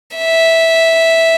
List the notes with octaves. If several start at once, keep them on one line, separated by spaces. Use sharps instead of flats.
E5